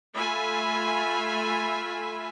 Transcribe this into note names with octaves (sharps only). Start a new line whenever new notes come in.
A3 F4 E5 G#5 B5